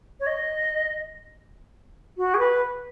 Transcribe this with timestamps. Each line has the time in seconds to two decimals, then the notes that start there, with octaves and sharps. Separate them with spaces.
0.19 C#5
0.26 D#5
2.17 F#4
2.34 G#4
2.38 B4